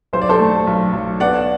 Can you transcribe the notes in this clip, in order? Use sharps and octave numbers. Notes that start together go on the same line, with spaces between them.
B1 C5
D5
A4 C5
A3
B1
B1
B3 D5 F#5